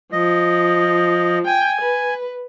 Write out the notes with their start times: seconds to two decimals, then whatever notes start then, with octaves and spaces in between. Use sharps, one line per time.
0.12 F3 D#5
1.47 G5 G#5
1.81 B4